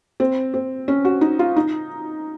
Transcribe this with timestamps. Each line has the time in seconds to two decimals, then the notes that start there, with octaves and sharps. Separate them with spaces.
0.20 C4
0.54 C4
0.88 C#4
1.05 F#4
1.21 D#4
1.39 F4
1.56 D#4